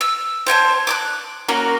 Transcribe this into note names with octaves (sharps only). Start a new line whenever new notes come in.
E6
C5 C#5 G5 A5
D6 D#6 F#6
A#3 C#4 F#4 A#4